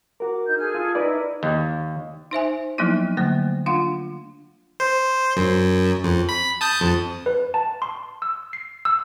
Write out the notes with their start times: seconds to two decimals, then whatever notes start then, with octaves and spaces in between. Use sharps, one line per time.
0.20 F#4 A#4 D6
0.45 D#4 G6
0.57 G#4 A4 F6
0.75 F4
0.95 D#4 E4 A#4 B4 D5
1.43 D#2
2.31 D#4 C5 E5 G#5
2.78 F3 F#3 A#3 B3 D#4 E4
3.17 D3 F#3 A3 A#3
3.66 D4 F4 F5 F#5
4.80 C5
5.36 F#2
6.04 F2
6.29 B5
6.61 A5 D#6 G6
6.80 F2
7.26 B4
7.54 A5
7.82 C6
8.22 E6
8.53 C7
8.85 E6